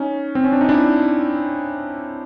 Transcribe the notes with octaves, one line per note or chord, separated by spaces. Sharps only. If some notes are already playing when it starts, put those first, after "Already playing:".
Already playing: C#4 D#4
C4
C#4
D4
D#4
D4 E4